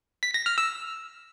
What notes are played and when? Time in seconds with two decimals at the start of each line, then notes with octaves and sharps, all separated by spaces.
0.23 B6
0.34 A#6
0.46 F6
0.58 E6